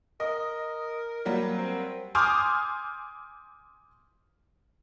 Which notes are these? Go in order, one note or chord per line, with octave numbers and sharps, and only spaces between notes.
A#4 D#5
F#3 G3 A#3
C4
G#5 C6 D6 D#6 F6 G6